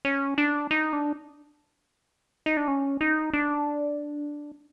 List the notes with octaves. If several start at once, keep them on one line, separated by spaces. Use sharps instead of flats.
C#4
D4
D#4
D4
D#4
D4
C#4
D#4
D4